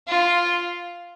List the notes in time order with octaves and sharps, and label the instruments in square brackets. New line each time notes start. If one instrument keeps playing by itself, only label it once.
[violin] F4